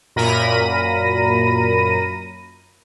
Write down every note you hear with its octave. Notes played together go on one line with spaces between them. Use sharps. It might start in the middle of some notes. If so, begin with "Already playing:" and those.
F#2 A#2 A#4 B5 A#6 D#7